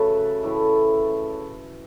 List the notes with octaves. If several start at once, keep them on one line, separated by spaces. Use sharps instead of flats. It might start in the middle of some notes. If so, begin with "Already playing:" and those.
Already playing: C#3 F#3 A3 A4 B4
A2 E3 A3